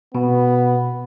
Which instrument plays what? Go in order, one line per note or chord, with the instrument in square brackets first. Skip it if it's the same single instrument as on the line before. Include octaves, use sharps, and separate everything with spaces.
[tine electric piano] B2 [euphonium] B3